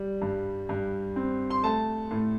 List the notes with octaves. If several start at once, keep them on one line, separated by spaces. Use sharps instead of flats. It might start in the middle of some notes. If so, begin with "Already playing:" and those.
Already playing: G3
G2
G2
C4
C6
A3 A5
A2